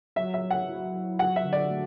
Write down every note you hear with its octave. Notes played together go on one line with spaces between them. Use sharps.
F#3 E5
E5
F#3
F#5
E4
F#3
F#4 F#5
E5
D3
D5
A3